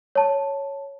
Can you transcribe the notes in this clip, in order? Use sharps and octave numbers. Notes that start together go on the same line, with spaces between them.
C#5 A5